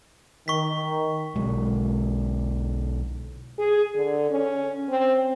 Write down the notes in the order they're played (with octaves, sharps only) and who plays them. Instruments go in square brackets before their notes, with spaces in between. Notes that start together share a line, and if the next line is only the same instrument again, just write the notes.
[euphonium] D#3 [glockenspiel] C#6 B6
[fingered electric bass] B1 G#3
[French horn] G#4
D3
C#4
C4